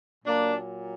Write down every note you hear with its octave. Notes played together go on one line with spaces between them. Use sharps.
A#2 F#3 A#3 D4